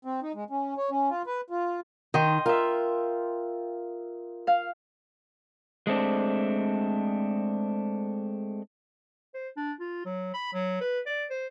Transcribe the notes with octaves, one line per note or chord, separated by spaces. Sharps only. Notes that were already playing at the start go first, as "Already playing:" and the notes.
C4
D#4
G#3
C#4
C#5
C#4
F4
B4
F4
D#3 D#5 G5 C6
F4 A#4 E5
F5
G#3 A3 C4 D4
C5
D4
F4
F#3
B5
F#3
B4
D5
C5